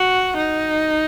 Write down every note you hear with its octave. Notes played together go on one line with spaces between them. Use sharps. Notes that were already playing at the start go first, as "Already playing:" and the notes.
Already playing: F#4
D#4